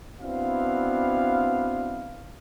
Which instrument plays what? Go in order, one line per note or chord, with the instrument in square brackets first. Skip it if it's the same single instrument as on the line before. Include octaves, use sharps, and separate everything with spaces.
[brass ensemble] B3 C4 D4 E4 F#4 F5